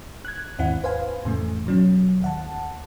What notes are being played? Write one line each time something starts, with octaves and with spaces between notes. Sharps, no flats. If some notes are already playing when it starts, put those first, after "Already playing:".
F#6 G#6
D#2 G#2 C4 E4 F#5
B4 C5 F5 G#5
F2 A2 C#3 E3 A3
B2 F#3 C#4
D#2 F#5 A5